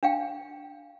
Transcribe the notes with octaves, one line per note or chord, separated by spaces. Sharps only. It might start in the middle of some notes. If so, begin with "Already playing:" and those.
D4 F5 G5